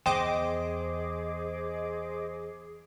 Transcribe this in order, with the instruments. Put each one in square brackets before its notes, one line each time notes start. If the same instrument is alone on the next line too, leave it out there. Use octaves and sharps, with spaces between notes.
[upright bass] E2 [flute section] G#4 [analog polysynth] C5 D#5 D6 [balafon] G5